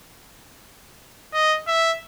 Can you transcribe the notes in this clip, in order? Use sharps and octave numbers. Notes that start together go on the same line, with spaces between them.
D#5
E5